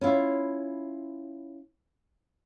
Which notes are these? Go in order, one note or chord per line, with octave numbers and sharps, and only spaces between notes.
C#4 E4 F4